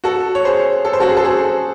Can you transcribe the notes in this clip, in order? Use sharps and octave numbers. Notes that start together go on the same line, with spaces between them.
F#4 A4
C#5
G#4 C5
A4
C5
F#4 A4
G#4
A4
G#4 C5